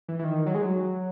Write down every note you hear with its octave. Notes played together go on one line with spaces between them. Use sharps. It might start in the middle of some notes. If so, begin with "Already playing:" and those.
E3
E3
D#3
F#3
G#3
F#3